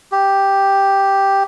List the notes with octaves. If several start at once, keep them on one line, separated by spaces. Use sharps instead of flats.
G4